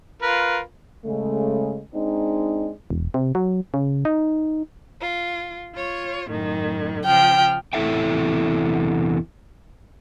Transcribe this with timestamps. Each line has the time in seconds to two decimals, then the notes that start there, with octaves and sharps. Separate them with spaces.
0.22 F4 A#4 B4
1.05 C#3 G#3 A3
1.94 G#3 C4 D4 D#4
2.90 E1
3.14 C3
3.35 F#3
3.74 C#3
4.05 D#4
5.00 F4
5.73 F4 C#5
6.30 F#2 A2 D#3
7.06 C#3 F3 G5 F6
7.73 E2 C3 E4 A4 E5 G5